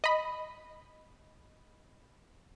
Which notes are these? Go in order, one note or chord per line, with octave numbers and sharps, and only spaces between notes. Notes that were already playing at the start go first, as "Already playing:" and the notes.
D#5 B5